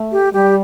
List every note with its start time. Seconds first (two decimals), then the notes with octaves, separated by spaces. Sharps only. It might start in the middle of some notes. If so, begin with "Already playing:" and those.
Already playing: A3
0.12 G4
0.33 G3 G4